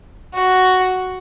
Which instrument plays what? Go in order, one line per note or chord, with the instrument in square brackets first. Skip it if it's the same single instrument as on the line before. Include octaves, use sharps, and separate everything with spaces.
[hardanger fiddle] F#4